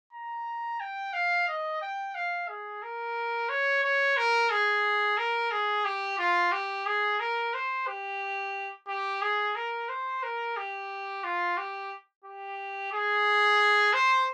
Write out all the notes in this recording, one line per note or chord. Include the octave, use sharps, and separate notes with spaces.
A#5
G5
F5
D#5
G5
F5
G#4
A#4
C#5
C#5
A#4
G#4
A#4
G#4
G4
F4
G4
G#4
A#4
C5
G4
G4
G#4
A#4
C5
A#4
G4
F4
G4
G4
G#4
C5